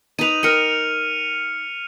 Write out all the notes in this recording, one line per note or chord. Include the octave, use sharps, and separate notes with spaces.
D#4 B4 D#7 F7
A#4 G5 F6 C#7 D#7